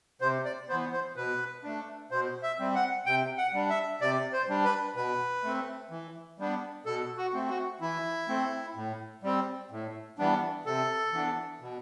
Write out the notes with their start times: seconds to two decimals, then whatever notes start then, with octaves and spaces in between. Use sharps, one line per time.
0.21 C3 C5
0.45 D5
0.69 B3 C5
0.73 E3
0.93 C5
1.16 B2 B4
1.64 A3 D4
2.11 B2 C5
2.43 E5
2.59 G3 C4
2.75 F#5
3.06 C3 G5
3.38 F#5
3.53 G3 D4
3.70 E5
4.01 C3 D5
4.33 C5
4.49 G3 D4
4.65 B4
4.96 B2 B4
5.43 A3 C4
5.90 E3
6.39 G3 B3 D4
6.85 B2 A4
7.17 F#4
7.33 A3 C4
7.49 F#4
7.81 E3 E4
8.28 A3 C4
8.76 A2
9.23 G3 C4
9.71 A2
10.18 E3 G3 B3 D4
10.66 C3 A4
11.13 E3 B3 D4
11.61 B2